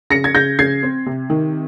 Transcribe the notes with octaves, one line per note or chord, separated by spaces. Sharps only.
C#3 A#6 C#7
G#6
C#3 G6 A#6
C#3 G#6 C7
C4
C3
D#3